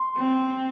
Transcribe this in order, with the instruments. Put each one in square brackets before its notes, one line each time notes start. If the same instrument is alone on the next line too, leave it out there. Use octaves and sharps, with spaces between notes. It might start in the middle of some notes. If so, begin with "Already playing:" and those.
Already playing: [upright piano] C6
[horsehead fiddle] C4